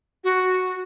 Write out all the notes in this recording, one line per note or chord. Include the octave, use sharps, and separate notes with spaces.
F#4